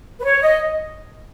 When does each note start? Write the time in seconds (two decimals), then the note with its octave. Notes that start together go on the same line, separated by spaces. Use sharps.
0.19 B4
0.24 C#5
0.41 D#5